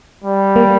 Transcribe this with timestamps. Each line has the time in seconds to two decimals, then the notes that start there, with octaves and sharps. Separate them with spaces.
0.24 G3
0.56 A#3